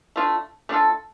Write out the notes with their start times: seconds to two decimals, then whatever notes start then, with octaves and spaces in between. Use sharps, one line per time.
0.16 A3 D4 F4
0.69 A3 D4 F4 A4